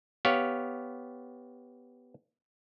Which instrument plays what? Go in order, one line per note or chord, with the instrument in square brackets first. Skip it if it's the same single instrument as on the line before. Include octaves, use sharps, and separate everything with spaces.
[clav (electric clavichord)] B3 G4 C#5 F5